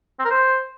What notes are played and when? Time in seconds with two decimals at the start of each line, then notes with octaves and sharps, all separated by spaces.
0.20 C4
0.25 A#4
0.31 C5